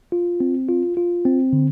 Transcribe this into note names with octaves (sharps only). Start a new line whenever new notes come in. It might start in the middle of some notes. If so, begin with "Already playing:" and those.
F4
C4
F4
F4
C4
D3